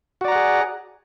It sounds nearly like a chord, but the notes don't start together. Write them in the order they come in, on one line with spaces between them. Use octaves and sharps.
F#4 D5 A#5 F#5 G#4